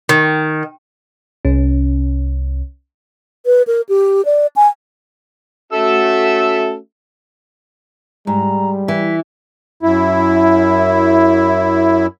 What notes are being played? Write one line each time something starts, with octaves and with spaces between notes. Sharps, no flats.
D#3
C2 C#4
B4
A#4
G4
D5
G#5
A3 C#4 F#4 A4 E5 E6
G#2 G3 A#5
E3 B6
F#2 E4